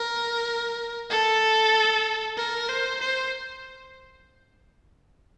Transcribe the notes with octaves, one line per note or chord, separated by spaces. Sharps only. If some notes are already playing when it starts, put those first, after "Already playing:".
Already playing: A#4
A4
A#4
C5
C5